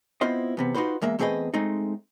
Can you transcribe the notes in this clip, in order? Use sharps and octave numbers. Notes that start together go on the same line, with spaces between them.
B3 C4 E4 F4 C5 D#5
E2 C3 B3
D#4 F4 F#4 B4 C5
E2 G#3 A#3 E5
E2 A3 C4 G#4 B4 D#5
G#3 A3 C4 D#4